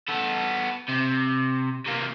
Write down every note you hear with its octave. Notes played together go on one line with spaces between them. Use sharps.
B3 A4
C3
C3 A#3